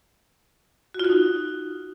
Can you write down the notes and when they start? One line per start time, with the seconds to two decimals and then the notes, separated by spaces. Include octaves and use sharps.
0.94 F#4
0.99 F4
1.04 F#4
1.09 D#4